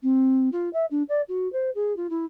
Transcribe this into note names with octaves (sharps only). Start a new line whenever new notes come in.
C4
F4
E5
D4
D5
F#4
C5
G#4
F4
E4